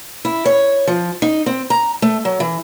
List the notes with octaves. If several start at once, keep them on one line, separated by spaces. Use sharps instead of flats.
E4
C#5
F3
D#4
C4
A#5
A3
F#3
E3